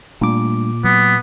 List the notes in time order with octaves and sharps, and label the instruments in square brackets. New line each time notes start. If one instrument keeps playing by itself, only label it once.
[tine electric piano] A#2 D6 [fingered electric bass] G3 A3 D4
[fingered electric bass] F#3 [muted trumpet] B3